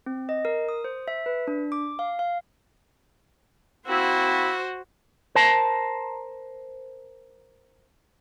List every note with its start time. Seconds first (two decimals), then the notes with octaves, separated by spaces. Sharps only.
0.06 C4
0.29 D#5
0.45 A#4
0.69 D#6
0.84 C5
1.08 E5
1.26 B4
1.48 D4
1.72 D6
1.99 F5
2.19 F5
3.87 A#3 C4 E4 F#4 C5
5.35 A#4 C5 A5